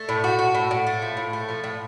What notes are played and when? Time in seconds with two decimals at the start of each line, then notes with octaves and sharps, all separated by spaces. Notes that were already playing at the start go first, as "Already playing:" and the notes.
Already playing: A3
0.09 A2
0.24 F#4
0.39 F#4
0.55 A2
0.71 A2
0.87 A3
1.02 F3
1.17 A2
1.33 A3
1.49 F3
1.64 A2